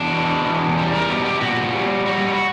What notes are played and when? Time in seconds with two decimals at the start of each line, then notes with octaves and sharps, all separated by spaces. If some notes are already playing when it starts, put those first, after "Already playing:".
Already playing: E2 D4
0.12 B2
0.44 E2
0.78 G3
0.93 A#4
1.09 B2 G4
1.25 G4
1.41 A#2 F#4
1.74 G3
2.06 G3 F#4